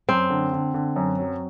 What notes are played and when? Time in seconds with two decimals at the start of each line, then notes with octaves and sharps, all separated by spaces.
0.09 F#2 C4
0.30 D3
0.53 D3
0.74 D3
0.96 F#2
1.19 F#3